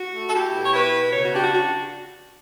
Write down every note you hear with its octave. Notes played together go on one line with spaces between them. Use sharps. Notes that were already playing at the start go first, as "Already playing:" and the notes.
Already playing: F#4
A3
A4
E4 G4
B2
C#5
E4 B4
B2
C#3 C#5
F#4
D4 G4
F#4
F#4